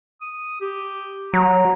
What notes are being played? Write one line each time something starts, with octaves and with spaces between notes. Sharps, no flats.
D#6
G4
F#3 A#5